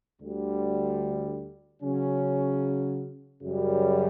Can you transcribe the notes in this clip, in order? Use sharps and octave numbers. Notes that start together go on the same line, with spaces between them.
D2 D3 G3
C#3 F#3 C#4
F#2 C#3 G3